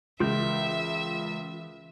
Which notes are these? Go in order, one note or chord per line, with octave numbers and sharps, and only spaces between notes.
C#2 E3 F4 A#4 E5 G6